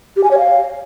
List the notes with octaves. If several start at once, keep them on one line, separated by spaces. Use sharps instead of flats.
G4
G#5
C#5
F5